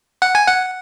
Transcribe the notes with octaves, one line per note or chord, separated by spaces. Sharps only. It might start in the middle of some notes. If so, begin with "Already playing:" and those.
F#5
G#5
F#5